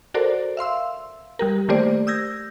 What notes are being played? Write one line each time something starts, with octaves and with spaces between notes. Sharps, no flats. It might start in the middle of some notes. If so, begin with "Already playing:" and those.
F#4 A4 A#4 C5 D5
E5 F5 C6 E6
G3 G4 A#4
D#3 A3 A#3 G4 C5 D5
D#6 E6 G6 G#6 A#6